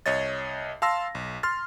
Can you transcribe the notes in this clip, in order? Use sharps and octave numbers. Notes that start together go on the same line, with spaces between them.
C2 C#5 D#5 A6
F5 A5 C6 E6 A#6
B1
C6 F6 A6